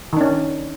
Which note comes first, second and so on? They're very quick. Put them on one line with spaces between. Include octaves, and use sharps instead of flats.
D#3 D4 C#4